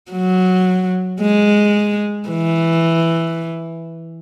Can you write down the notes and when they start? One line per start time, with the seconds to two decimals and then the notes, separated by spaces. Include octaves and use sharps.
0.12 F#3
1.21 G#3
2.29 E3